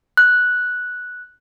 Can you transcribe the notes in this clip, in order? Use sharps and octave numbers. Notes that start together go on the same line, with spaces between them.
F#6